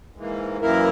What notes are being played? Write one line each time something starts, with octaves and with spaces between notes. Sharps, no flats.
G#2 E3 A#3
F#2 E3 A#3 E4 A#4